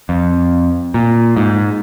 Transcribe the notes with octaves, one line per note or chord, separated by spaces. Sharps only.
F2
A#2
G#2